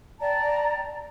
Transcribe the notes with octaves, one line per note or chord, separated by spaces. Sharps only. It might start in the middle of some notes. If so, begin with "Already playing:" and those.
D5 G5 A5 A#5